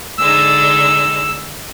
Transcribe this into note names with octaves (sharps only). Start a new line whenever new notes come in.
D3 G#3 D#4 E6